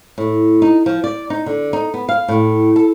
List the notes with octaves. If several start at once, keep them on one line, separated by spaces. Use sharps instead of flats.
A2
D#4
F3
D5
D#4
D3
D#4
B3
F5
A2
A4